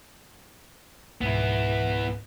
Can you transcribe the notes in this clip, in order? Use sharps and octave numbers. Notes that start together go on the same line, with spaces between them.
C#2 G#2 B2 B3 E4